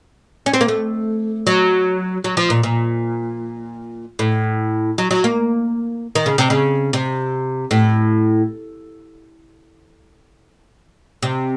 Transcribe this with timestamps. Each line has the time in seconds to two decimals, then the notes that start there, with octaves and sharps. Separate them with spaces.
0.46 C#4
0.53 C4
0.61 A#3
0.68 A3
1.47 F#3
2.24 F#3
2.37 F3
2.50 A#2
2.63 A#2
4.19 A2
4.98 F#3
5.11 F#3
5.24 A#3
6.15 D#3
6.26 C#3
6.38 C3
6.50 C#3
6.93 C3
7.71 A2
11.23 C3